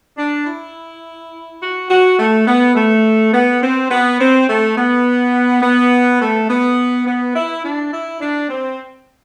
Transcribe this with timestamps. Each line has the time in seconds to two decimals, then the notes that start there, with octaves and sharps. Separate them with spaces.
0.18 D4
0.46 E4
1.61 F#4
1.90 F#4
2.18 A3
2.47 B3
2.75 A3
3.33 B3
3.62 C4
3.90 B3
4.20 C4
4.47 A3
4.77 B3
5.62 B3
6.20 A3
6.49 B3
7.06 B3
7.35 E4
7.64 D4
7.92 E4
8.20 D4
8.49 C4